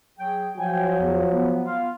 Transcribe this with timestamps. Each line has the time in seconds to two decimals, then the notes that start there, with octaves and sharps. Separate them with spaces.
0.18 F#3 G#4 G5
0.58 F3 F#3 G5 G#5
0.99 E2
1.31 B3
1.65 B3 F4 F5